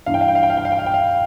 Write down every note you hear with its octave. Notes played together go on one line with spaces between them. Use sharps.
G2 E3 F5
G5
F5
G5
F5
G5
F5
G5
F5
G5
F5
G5
F5